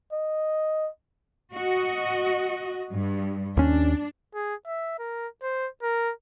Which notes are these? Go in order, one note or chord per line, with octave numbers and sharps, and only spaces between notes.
D#5
F#4 D#5
G2
D#2 C#4 D4
G#4
E5
A#4
C5
A#4